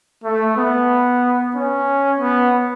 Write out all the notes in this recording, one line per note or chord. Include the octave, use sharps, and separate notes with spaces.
A3
B3
C#4
B3